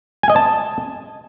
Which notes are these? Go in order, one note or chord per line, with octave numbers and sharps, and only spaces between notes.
G#5
D#5
A5